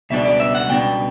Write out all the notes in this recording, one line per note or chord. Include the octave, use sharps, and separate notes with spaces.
C#2 B2 G3 D4 E5
D5
E5
F#5
C#2 B2 G3 D4 G5